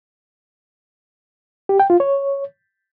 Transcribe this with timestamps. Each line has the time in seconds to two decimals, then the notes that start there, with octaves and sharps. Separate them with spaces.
1.69 G4
1.80 G5
1.90 F4
2.00 C#5